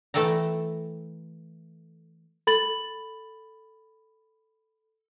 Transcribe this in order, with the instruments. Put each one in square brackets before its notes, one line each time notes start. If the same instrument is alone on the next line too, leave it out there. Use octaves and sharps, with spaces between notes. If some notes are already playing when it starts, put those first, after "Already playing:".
[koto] E3 A3 A4 G5 A#5
[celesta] A4 B5 A6 F#7